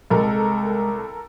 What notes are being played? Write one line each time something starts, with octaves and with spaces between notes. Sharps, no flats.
C2 G#3 A4 A#4